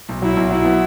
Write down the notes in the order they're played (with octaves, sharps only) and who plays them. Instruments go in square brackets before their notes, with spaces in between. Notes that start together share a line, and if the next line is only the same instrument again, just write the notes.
[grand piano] B1
[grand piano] F#3 [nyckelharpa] E4
[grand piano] B1
[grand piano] F#3 [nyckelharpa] E4
[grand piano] B3